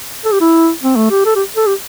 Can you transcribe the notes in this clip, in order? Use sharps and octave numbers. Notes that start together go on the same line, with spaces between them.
A4
G4
E4
C4
A3
G4
A4
G4
A4
G4